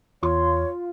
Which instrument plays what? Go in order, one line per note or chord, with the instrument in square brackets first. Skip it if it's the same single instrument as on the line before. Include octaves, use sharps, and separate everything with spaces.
[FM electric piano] E2 [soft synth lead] F4 [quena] C#5 [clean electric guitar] C6